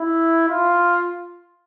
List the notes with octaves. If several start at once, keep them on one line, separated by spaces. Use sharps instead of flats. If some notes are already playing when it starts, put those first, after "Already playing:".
Already playing: E4
F4